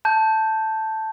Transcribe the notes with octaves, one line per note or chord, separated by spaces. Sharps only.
A5 G6